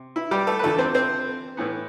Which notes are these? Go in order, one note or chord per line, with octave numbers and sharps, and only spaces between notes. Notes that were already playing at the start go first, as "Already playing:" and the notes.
Already playing: C3
E4
G3 G4
A3 A4
B4
E2 D3 F3 A3 A4
C4 C5
C4 C5
A2 E3 B3